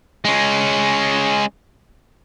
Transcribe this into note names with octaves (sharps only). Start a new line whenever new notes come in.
G#3 C#4